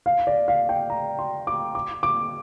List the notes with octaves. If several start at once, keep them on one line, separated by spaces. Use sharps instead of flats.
F5
D5
F5
G5
A#5
C6
D6
D6
D6